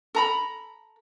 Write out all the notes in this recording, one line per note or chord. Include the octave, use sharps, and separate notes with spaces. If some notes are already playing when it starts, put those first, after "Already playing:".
A4 A#5 B5